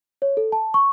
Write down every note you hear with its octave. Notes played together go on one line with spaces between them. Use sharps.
C#5
A4
A5
C#6